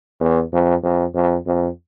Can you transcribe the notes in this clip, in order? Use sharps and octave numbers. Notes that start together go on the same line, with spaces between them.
E2
F2
F2
F2
F2